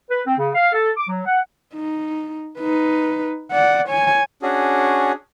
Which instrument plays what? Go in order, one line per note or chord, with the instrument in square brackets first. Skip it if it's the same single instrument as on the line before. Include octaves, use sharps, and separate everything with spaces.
[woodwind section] B4
C4
C#3
F5
A4
D6
F#3
F#5
[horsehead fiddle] D#4
D#4 B4
D5 F#5
C#5 G#5
[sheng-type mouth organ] C#4 D4 F#4 G#4